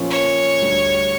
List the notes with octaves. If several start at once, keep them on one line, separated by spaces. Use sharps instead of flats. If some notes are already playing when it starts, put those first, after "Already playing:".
Already playing: A#2 F3 A#3 C#4
C#5
D2 D3 G3